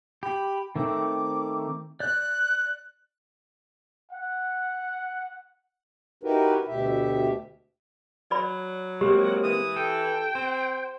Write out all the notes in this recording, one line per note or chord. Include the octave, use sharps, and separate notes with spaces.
G4 B5
D#3 A3 C4 D6
D5 F#6 G6
F#5
D#4 E4 F#4 G4 A#4 B4
D2 B2 G4 E5
F#3 D5 B5
G#3 A#3 C4 G4
E3 D#6
A4 G5
C4 C5